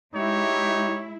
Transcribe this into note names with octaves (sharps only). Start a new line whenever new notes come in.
G#3 D#4 E4 G4 C#5